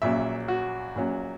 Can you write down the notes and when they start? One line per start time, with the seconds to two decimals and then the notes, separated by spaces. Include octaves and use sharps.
0.02 A#1 A#2 F#3 C#4 E5
0.48 F#4
0.95 A#1 A#2 F#3 C#4